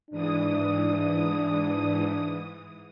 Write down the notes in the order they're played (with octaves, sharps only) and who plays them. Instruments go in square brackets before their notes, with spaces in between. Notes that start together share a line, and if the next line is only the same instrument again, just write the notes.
[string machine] G#2 E3 D#6 [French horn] D4